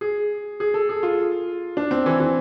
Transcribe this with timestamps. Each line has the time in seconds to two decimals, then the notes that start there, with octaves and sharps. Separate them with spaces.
0.01 G#4
0.60 G#4
0.74 A4
0.89 G#4
1.03 F4
1.77 D4
1.91 C4
2.06 E3
2.20 E3